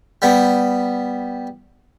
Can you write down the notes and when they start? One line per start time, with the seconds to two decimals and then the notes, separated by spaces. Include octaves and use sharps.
0.22 G3 B3